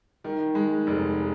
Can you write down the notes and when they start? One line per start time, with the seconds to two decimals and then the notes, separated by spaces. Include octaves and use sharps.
0.24 D#3
0.55 G#3
0.87 F1